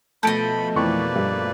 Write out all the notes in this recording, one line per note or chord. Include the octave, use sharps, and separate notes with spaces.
B2 F3 A3 A4 D#5 B5 G6 D7
F2 E3 A#3 B4 D5 C#6
G2